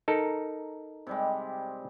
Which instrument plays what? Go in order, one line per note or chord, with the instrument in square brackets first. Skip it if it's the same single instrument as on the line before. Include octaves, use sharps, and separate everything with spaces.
[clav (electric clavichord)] D#4 A4 A#4
[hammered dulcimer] C3 G3 G#3